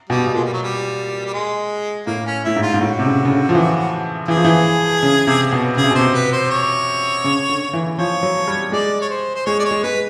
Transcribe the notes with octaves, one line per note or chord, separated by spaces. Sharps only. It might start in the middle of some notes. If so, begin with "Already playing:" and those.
B2 G3
B2
A#2 G#3
G3
F#3
G3
G3
G#3
A2 A#3
C#4
A2 E4
G#2
F4
G#2
A2 F#4
C3
C#3
C#3
D3
F3
E3
E3 G#4
F3
E3
C#3
C3
B2
C#3 G#4
C3
B2
C3 C5
B4
C5
C#5
C#3
D3
E3
F3 C#5
F#3
G3
G#3 D5
C#5
C5
C5
G#3 C#5
D5
C#5
G#3
G#3 B4